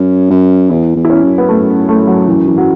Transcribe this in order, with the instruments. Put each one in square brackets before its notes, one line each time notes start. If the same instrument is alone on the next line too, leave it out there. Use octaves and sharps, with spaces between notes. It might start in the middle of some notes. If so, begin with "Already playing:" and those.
Already playing: [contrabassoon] F#2 [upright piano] C#4
[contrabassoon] F#2
[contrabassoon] E2 [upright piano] E4
[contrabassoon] E2
[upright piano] E4
C#4
[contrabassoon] F#2
[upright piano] B3
A3
A3
F#3
E3
E3
F#3